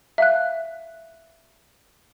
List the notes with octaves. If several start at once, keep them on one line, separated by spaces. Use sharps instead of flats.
E5 F5 F#6